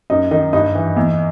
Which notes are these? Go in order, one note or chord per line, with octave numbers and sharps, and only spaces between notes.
F#2 D#4
D#3 D#4
G2 D#4
E3
E2